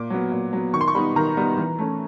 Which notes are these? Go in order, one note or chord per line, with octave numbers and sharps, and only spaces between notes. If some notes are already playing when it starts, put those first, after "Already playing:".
Already playing: A#2 D6
F#3 B3
A#2
F#3 B3
D#3 C#6
C6
C#6
G3 B3 D#4 B5
D#3 A#5
G3 B3 D#4
E3
A3 C#4